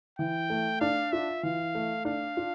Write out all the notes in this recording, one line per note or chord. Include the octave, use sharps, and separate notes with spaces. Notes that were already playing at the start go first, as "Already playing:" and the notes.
E3 G5
A3
D4 F5
F4 E5
E3 F5
A3
D4 F5
F4